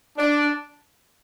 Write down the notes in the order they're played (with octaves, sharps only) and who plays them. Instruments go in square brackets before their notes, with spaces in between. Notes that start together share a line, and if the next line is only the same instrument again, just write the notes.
[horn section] D4